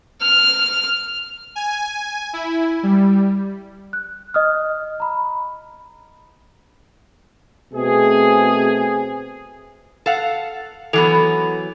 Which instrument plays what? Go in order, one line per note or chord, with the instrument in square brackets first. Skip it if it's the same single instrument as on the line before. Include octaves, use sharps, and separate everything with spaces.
[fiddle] F6
[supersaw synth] G#5
E4
G3
[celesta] F#6
D#5 D#6 F6
A#5 B5
[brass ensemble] B2 A3 C4 G#4
[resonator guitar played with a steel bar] A4 F5 F#5
[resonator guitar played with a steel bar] E3 F#3 B3 [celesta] A4 F7